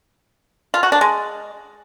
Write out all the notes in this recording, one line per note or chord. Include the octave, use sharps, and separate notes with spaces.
F4
F#4
D4
G#3